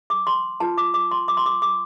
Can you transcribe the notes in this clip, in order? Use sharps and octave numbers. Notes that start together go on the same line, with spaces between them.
D6
C6
F4 B4 A5
D6
D6
C6
D6
C6
D6
D6